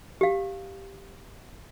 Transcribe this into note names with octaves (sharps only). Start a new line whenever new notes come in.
G4 F5